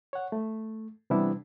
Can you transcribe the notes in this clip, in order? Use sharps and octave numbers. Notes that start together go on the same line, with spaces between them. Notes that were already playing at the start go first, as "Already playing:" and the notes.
C#5 F#5
A3
C3 E3 G3 B3 D4 E4